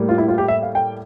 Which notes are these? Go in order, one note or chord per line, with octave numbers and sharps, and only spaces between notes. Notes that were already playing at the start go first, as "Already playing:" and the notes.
Already playing: A2 G3 A#3
F4
E4
F4
G4
E5
F5
G5